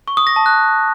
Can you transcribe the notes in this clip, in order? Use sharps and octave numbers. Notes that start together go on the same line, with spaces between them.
C#6
D#6
A#6
A5
F#6